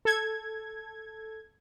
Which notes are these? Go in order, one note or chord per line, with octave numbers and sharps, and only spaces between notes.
A4 G#6